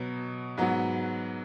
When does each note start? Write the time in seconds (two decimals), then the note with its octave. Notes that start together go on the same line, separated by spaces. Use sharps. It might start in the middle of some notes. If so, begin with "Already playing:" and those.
Already playing: B2 F#3 B3
0.57 G#2 F#3 B3 F#4